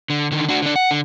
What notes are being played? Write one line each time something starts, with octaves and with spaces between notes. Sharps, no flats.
D3
D3 D#3
D4 F#4
D3 D4
F#5
D3